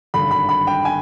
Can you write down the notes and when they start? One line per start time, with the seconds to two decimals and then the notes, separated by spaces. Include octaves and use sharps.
0.14 G#1 G2 D3 B5
0.31 B5
0.49 B5
0.67 G5
0.85 G#5